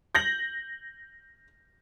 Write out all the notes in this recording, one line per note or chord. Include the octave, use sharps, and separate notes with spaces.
G6 A#6 F#7